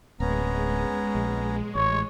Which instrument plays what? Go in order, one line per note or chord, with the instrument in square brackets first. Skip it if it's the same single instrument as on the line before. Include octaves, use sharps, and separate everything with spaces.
[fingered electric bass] D1 [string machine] G#3 [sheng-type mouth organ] B3 C#4 A#5
[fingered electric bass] A#1
[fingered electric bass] A1 [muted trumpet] C#5